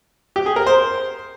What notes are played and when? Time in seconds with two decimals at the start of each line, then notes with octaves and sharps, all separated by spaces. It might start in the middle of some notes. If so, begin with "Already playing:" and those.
0.36 G4
0.46 G#4
0.56 A#4
0.66 C5